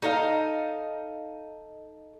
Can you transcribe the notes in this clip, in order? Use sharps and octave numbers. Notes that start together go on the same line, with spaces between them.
D#4 A4 D#5 F5